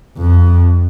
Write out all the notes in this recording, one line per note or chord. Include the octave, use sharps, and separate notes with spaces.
F2